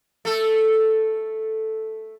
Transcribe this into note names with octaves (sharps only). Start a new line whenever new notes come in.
A3 A4